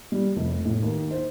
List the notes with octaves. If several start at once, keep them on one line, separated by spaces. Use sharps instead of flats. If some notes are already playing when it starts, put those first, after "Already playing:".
G3
F1
A2
D#2
C5